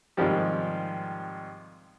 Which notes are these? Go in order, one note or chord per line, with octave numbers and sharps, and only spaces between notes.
G#2 C3 D#3 F3 G3